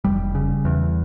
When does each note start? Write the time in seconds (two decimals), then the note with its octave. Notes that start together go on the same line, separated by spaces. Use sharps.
0.04 F1 G3
0.35 C#3
0.65 E2